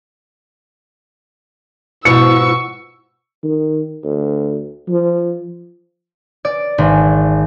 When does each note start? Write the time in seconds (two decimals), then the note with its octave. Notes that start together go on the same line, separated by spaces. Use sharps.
2.05 G#2 B2 F3 E4 C#6 E6 C#7
3.43 D#3
4.04 D2
4.89 F3
6.45 D5
6.78 G#1